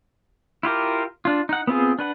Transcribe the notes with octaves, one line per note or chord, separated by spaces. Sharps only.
E4 F4 G4 A#4
D4 F4
D#4 F#5
B3 C4 F4 G#4
D4 B4 F#5